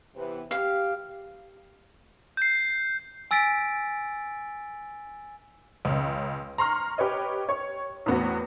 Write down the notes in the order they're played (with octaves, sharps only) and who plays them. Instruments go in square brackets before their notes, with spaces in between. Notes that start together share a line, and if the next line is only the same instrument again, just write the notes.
[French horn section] C3 E3 B3
[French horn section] G4 [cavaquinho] F5
[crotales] G6 C7
[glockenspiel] G#5 E6 A6 B6 D7
[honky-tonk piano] C#2 C#3
A#5 C6 C#6 F6
G4 B4 C#5 D#5
C#5 C#6
E2 A2 B3 C4 F#4